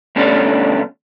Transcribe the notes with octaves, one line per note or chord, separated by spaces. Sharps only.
G2 B2 D3 A3 C#4 D4